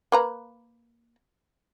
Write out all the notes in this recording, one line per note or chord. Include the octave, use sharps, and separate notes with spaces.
A#3 B4 A#5